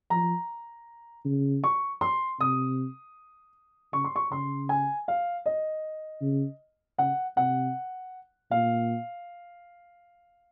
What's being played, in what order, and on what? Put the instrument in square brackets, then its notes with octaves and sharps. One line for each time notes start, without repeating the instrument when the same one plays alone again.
[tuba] F3 [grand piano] A#5
[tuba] C#3
[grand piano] C#6
C6
[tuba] C3 [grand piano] D#6
[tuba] C#3 [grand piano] C#6
[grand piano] C6
C#6
[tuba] C#3 [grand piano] C6
[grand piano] G#5
F5
D#5
[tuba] C#3
[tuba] C#3 [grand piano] F#5
[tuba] C3 [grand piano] F#5
[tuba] A#2 [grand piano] F5